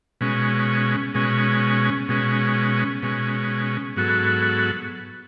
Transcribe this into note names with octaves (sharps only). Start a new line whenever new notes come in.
B2 G#3 C#4
B2 G#3 C#4
B2 G#3 C#4
B2 G#3 C#4
G#2 F#3 B3 F#4 A4